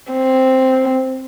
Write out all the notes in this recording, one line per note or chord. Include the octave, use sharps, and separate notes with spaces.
C4